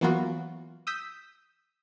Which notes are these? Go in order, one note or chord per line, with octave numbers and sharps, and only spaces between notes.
E3 F#3 A#3 B3 F4 F#4
D#6 E6 G6 B6